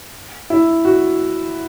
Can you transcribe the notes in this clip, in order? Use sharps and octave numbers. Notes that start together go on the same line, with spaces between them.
E4
F#4